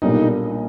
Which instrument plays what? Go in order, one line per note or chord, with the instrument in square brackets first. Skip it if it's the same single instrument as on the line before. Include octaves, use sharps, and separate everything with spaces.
[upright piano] B1 A#2 G3 A#3 D4 [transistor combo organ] D#4